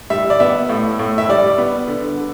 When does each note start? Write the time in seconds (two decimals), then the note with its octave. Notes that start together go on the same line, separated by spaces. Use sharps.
0.10 G3 E5
0.30 D5
0.40 B3 E5
0.69 A2
0.99 A2
1.18 E5
1.29 G3 D5
1.58 B3
1.88 D3
2.17 D3